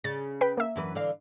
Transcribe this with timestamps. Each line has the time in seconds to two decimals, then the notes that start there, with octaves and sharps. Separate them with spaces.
0.04 C#3 A6
0.41 B4 G5 B6
0.57 A#3 E5
0.76 F#2 E3 B4
0.95 D3 E3 F5